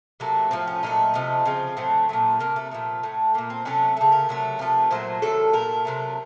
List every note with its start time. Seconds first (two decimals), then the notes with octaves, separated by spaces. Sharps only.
0.20 C3 F#3 A3 A#3
0.51 A2 F3 A3 C4
0.67 C#4
0.83 A#2 F#3 A3 D#4
1.14 C3 F3 A3
1.45 C#3 F3 A3 C4
1.77 A2 F#3 A3 C4
2.09 A#2 F#3 A3
2.39 C3 F3 A3 A#3
2.56 A3
2.71 A#2 F3 A3
3.03 A2 A3
3.34 A#2 A3 A#3
3.50 C4
3.65 C3 F#3 A3 C#4
3.96 C#3 A3 A4
4.12 A#4
4.29 C3 F#3 A3
4.59 C3 F3 A3
4.90 A#2 F#3 A3 C5
5.22 C3 D#3 F#3 A4
5.53 A#2 A3 A#4
5.85 C3 F#3 A3